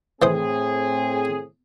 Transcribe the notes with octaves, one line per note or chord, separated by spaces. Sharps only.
A2 E3 C4 G#4 C5 D#6